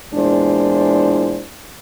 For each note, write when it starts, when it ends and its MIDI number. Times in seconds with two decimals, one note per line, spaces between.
0.14 1.43 40
0.14 1.43 46
0.14 1.43 56
0.14 1.43 62
0.14 1.43 64
0.14 1.43 72